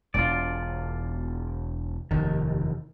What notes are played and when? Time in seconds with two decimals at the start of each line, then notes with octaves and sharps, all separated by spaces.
0.14 E1 G#3 F4 D5
2.11 F1 D#2 D#3